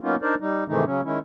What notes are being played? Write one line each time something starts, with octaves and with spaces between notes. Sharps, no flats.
F#3 A#3 B3 C#4 D#4 F4
D4 D#4 A#4 C5 D5
G3 D#4
G#2 C3 D#3 E3 A3 D#4
C#3 F#3 C#4
D#3 G#3 C#4 E4